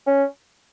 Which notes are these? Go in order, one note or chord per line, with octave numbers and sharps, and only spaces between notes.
C#4